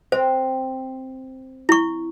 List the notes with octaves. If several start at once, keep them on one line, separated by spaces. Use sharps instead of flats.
C4 C5
E4 C#6